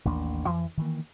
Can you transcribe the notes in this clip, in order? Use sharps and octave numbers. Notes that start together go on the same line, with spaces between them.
A1 D#2 A#3 D4
F2 E3
D#3 E3 A#3